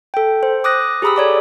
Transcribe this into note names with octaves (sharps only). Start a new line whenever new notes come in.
A4 G5
C5
D6 D#6 F#6 A#6
G4 G#4 A#5 B5 D#6 E6
A4 C#5 D5 D6